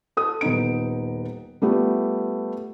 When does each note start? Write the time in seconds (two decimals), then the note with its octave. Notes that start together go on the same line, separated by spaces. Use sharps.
0.17 A4 D#6
0.41 D#1 B3 D#4 D7
1.62 G3 A3 B3 F4 G4